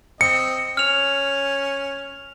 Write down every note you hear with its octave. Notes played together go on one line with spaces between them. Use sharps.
C4 D#5 C#7
C#4 F6 F7